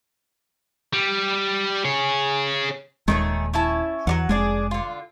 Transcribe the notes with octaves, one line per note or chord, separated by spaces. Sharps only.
G3
G#4 C#5
D#1 D#2 D#3 G#3 A3 C#4
C#4 E4 A5
E2 F#3 G3 F#5
F1 G#3 D4 G#4 D5
D3 F4